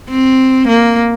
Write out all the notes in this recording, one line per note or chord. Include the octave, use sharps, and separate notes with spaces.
C4
A#3